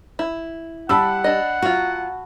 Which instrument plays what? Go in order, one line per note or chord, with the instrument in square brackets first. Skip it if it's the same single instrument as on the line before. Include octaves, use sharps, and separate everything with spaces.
[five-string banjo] E4
[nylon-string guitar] G3 [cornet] F#5 [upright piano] A5 B5 E6
[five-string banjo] D4 D#5
[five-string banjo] F#3 F4 [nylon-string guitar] F#4